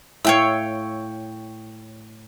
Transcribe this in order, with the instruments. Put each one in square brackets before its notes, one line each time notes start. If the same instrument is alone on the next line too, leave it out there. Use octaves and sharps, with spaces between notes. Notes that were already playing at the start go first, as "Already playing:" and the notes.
[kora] A2 F5 [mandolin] C#5 G5 E6